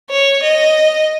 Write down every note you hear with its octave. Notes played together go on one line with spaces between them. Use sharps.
C#5
D#5